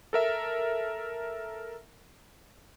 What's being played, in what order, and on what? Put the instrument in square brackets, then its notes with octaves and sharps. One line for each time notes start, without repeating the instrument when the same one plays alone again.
[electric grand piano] A4 A#4 E5